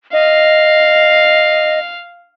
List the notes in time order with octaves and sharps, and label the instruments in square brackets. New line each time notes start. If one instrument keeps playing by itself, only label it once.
[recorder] D#5 [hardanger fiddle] F5